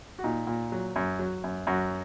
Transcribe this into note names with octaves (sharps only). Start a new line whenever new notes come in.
F#4
A#2 D#4
A#2
F#3
F#2
F#3
F#2
F#2 F#4